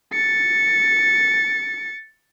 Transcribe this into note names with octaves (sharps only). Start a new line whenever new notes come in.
A6 C#7